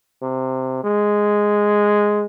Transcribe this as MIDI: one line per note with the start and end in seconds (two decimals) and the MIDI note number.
0.22 0.80 48
0.84 2.26 56